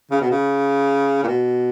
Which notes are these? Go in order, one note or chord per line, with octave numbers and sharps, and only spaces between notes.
C#3
B2
C#3
A#2
B2